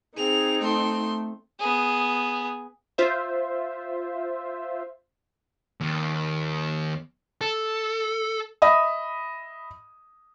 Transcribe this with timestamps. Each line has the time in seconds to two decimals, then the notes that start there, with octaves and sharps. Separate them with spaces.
0.17 C4 D#4 G#4 F7
0.61 A3 A4 C6
1.60 B3 G#4
2.98 F4 C5 E5
5.80 D#2
7.41 A4
8.62 D#5 E5 B5 D#6